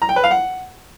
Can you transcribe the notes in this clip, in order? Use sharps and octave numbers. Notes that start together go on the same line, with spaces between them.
A#5
G5
B4
F5
F#5